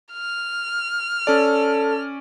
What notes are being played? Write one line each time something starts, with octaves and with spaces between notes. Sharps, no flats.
F6
C#4 A4 D5